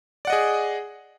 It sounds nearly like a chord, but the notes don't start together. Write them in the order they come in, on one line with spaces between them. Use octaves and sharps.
D5 F#5 D#5 G#4